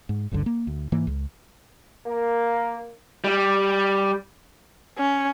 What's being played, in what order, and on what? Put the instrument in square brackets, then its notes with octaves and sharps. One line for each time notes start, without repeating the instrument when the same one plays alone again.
[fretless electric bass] G#2
G1 C#2 G2 D3
A#3
D2
G#2 E3 A#3
C#2
[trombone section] A#3
[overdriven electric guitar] G3
[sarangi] C#4